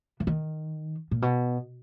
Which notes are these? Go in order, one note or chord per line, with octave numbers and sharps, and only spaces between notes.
E3
D#3
A#2
B2